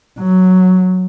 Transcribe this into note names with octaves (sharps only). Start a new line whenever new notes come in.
F#3